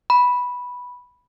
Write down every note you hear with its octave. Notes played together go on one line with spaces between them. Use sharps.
B5